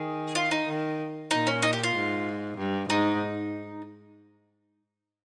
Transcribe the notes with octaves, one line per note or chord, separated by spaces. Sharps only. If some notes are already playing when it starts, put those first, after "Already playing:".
Already playing: D#3 G#4
F4
D#4
D#3
A#2 D#4
C#4
D#4
G4
F4
G#2
G2
G#2 D#4